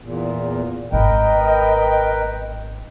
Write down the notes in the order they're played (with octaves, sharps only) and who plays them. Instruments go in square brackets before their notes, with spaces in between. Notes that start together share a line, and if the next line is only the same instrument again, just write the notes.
[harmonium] E2 A#2
[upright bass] G#1 [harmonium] A#4 B4 G5 [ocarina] D#5